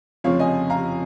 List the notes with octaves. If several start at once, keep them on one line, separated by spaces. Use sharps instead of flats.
F1 F2 C#3 F3 C#5 F5
D#5 G#5
F5 A#5